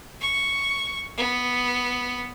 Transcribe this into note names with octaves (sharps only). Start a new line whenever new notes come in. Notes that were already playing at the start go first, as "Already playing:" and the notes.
C#6
B3